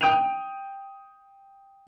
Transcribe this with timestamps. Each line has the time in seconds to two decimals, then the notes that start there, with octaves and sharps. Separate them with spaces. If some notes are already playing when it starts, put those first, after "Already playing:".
0.01 G5 D#6 G6 D7 D#7 F7